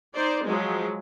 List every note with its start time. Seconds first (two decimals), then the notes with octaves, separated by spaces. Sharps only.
0.14 D#4 C5 D5
0.45 F3 F#3 G#3